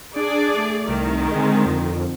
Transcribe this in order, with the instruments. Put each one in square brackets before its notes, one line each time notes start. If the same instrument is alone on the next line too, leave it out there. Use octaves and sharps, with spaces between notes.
[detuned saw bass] D4 [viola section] G#4 D5
[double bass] A3
[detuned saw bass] C2 [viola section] D#3
[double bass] D3 C4 [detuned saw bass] G#3
[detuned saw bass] F2